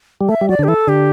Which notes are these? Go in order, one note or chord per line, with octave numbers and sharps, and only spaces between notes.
G3
A3 E5
G3
F#3 D5
D3
G4
E3 A4
D3 G4